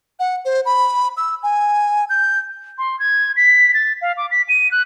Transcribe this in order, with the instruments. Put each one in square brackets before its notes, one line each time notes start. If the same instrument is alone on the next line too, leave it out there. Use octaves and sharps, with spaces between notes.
[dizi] F#5
C5
B5
E6
G#5
G6
[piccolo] C6
G#6
B6
A6
F5
D6
B6
D#7
F#6